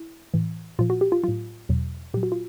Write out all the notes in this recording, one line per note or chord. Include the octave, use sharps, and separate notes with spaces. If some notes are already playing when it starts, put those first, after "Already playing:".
Already playing: E4
A2 E3
A#2 F3 F4
F#4
G4
F4
A2 F#3 F4
E2 B2 F#3
A#2 F#3 G4
F#4
F4